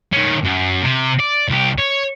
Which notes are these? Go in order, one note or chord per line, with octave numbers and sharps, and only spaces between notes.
D#3 C#4
F#2
C3
D5
C2 G4
C#5